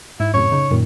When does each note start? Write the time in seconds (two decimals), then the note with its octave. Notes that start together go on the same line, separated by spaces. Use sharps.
0.20 G#2 E4
0.34 F#2 A2 C3 C#5
0.52 C#3 D#4
0.71 F#2 A#2 D#3